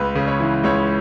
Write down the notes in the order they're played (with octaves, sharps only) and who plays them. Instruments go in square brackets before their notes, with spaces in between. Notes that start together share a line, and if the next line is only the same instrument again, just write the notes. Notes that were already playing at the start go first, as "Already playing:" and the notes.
Already playing: [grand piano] C#2 B4
C#3
C#5
E3
C#2 C#5